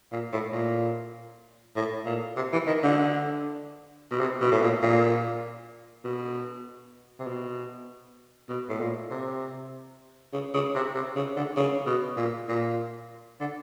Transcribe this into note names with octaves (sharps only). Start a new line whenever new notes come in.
A#2
A2
A#2
A2
A#2
C3
E3
D#3
D3
B2
C3
B2
A2
A#2
A#2
B2
C3
B2
B2
A2
A#2
C3
C#3
C#3
C3
C3
C#3
D3
C#3
B2
A#2
A#2
D3